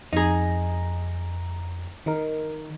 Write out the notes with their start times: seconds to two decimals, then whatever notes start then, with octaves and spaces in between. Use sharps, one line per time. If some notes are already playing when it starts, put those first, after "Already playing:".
0.13 F2 D#4 G#4 A#5
2.06 D#3 D#4 A#4